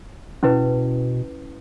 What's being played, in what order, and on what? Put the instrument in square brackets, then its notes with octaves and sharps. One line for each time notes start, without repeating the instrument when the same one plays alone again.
[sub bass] B2 [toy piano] C#4 E4 B4